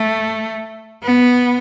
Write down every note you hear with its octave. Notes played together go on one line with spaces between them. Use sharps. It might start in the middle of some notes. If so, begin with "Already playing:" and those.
Already playing: A3
B3